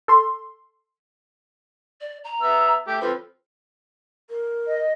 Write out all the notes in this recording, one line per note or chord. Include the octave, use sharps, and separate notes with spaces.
A4 C6
D5
A#5
B3 E5 E6
A3 G4
F3 C4 A4 B4
A#4
D#5